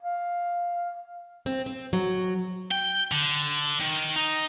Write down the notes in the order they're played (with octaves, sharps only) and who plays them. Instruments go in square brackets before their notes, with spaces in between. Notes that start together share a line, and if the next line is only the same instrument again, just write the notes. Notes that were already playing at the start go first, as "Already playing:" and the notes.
[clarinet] F5
[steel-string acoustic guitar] C4
C4
F#3
[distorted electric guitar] G5
D3
D#3
D#4